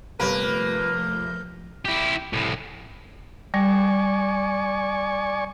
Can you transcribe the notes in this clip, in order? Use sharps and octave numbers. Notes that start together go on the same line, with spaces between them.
G1 C3 F3 A3 A#3 B4 B5 G6
E4 G4
C2 A2
G3 D5 G#5 C#6